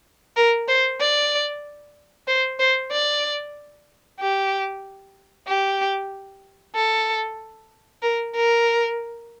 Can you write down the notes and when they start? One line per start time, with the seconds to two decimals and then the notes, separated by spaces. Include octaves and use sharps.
0.36 A#4
0.68 C5
1.00 D5
2.28 C5
2.59 C5
2.92 D5
4.20 G4
5.47 G4
6.75 A4
8.03 A#4
8.35 A#4